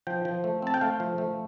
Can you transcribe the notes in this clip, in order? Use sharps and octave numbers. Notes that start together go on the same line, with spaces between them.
F3 G5
F3
A3
C4 A5
G5
A3 F5
F3
A3